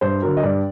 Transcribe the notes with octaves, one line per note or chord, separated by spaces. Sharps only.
G2 C5
D3 F#3 A#4
D#5
G2 D5